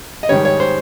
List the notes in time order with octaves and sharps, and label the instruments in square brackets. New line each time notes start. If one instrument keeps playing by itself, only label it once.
[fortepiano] D#5
G#2 D#3 G3 C#5
C#5
C5